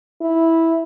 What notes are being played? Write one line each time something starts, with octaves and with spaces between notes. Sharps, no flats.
E4